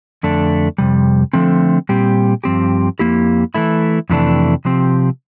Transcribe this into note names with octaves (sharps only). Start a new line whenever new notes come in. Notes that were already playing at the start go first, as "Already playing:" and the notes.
F2 D3 A3 D4
F2 C3 G3
D3 F3 A3 C4
A#2 G3 C4 G4
G2 F3 C4 G4
F2 E3 A#3 E4 G4
E3 A3 E4
F2 C3 E3 A3 D4
C3 F3 C4 G4